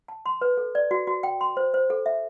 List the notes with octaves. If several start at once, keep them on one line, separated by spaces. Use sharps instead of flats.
A5
C6
B4
A4
D5
F#4
F#4
G5
C6
C5
C5
A4
E5